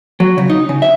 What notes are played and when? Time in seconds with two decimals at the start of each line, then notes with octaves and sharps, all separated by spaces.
0.20 F#3
0.38 C#3
0.50 D#4
0.69 C#3
0.82 E5